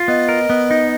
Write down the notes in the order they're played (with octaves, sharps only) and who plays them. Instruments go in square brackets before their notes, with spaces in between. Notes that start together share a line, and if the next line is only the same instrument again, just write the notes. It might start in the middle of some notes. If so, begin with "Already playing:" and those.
Already playing: [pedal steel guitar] F4
[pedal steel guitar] B3 [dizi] D#5
[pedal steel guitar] A#4
B3
D#4